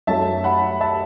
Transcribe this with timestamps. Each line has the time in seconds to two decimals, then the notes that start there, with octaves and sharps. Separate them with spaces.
0.07 F#2 F#3 A3 E5 A5
0.44 F#5 B5
0.81 E5 A5